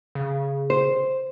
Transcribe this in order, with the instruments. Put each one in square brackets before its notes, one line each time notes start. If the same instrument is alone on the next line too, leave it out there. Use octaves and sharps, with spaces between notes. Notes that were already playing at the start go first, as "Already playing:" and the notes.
[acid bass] C#3
[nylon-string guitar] C5